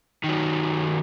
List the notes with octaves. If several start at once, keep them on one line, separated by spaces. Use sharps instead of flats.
D#3 F#3